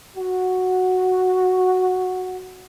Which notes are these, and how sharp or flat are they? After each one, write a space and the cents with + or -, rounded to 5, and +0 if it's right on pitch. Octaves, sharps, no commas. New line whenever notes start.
F#4 -5